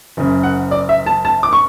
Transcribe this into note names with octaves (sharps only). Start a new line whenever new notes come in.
F#1 F#2 C#3
F#5
D5
E5
A5
A5
D6
C#6